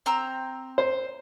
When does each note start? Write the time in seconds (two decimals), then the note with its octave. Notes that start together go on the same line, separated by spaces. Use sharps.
0.06 C4 A#5 E6
0.78 C5